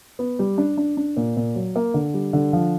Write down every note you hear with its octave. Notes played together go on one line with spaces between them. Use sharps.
B3
G3
D4
D4
D4
A#2
A#2
F#3
A#3
D3
G3
D3
F3